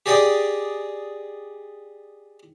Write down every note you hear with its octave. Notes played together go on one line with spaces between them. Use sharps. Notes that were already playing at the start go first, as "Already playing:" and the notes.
G4 G#4 D5 D#5 G5 D6